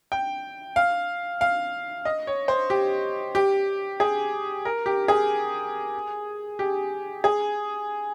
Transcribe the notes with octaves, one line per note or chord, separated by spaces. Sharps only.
G5
F5
F5
D#5
C#5
C5
G4
G4
G#4
A#4
G4
G#4
G4
G#4